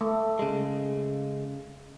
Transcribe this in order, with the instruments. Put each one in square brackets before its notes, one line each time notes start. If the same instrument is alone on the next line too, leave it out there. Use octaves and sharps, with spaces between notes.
[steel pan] A3
[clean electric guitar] C#3 G#3